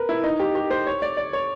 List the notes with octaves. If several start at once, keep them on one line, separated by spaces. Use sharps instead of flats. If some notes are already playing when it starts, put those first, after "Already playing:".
Already playing: A#4 B4
E4
D#4
G4
G4
C5
C#5
D5
D5
C#5